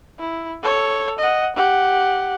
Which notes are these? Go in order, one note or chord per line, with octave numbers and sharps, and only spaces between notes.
E4
A4 C#5
D#5 F#5
G4 F#5